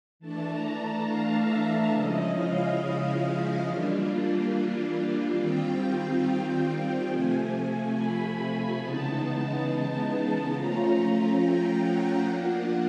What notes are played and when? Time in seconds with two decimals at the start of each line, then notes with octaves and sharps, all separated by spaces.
0.19 E3 A3 D4 A5
0.48 A#5
0.78 A#5
1.05 F5
1.34 E5
1.62 E5
1.92 C#3 F3 G#3 C#4 E4 D#5
2.34 F5
2.78 F5
3.63 E3 G3 A#3 D4 F4
5.36 D#3 G3 C4 F4 G5
7.08 C3 F3 A3 G#5
7.94 B5
8.79 C#3 E3 G#3 B3 D#4 A5
10.51 F3 A3 C#4 F4 A#5
11.37 G5
11.81 F#5
12.23 F3 A#3 D4 F4 F#5